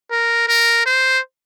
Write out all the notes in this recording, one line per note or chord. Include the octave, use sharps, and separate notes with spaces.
A#4
A#4
C5